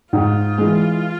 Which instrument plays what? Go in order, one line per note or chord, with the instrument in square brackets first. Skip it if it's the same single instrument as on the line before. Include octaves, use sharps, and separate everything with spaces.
[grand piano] G#2 [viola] F4
[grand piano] E3 G#3